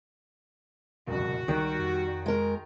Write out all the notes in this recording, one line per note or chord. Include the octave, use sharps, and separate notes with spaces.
F#1 C2 F2 A#2 F#4
C#2 D#3 G3 F#6
F2
G#3 A#4